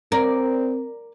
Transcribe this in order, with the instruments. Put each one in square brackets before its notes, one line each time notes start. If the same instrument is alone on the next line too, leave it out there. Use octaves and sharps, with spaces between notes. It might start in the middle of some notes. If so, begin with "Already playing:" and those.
[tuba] C4 [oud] A#4 D5